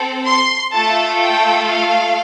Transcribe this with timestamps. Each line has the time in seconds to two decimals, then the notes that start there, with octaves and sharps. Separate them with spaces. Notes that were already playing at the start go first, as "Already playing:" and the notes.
Already playing: C4 A4
0.26 C6
0.73 A3 F4 A4 A5
1.21 G5
1.68 F5